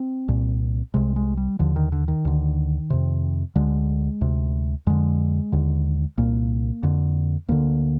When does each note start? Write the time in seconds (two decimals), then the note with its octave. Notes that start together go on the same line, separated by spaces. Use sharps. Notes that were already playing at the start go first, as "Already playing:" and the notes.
Already playing: C4
0.28 C2 A#2
0.94 C2 C3 G#3
1.16 G#3
1.37 G3
1.59 D#2 D3 F3
1.76 D#3
1.92 D3
2.08 D#3
2.25 D2 D3
2.90 F2 C3
3.56 D2 D3 G#3
4.21 D2 C3
4.87 F2 D3 G#3
5.52 D#2 D3
6.18 C2 A#2 A#3
6.83 F2 D3
7.48 D2 D3 A#3